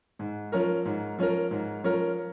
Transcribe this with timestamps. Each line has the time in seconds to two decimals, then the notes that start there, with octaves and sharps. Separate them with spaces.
0.19 G#2
0.52 F3 C#4 A#4
0.85 G#2
1.19 F3 C#4 A#4
1.51 G#2
1.84 F3 C#4 A#4